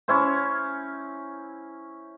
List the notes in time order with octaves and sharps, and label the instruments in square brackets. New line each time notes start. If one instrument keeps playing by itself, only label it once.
[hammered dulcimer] C#4 E4 C5